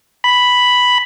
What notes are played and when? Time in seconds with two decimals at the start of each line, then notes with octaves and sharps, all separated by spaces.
0.24 B5